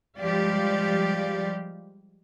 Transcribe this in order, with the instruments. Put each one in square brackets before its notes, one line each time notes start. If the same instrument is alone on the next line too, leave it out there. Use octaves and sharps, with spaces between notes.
[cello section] F3 G3 G#3 G4 D5 F5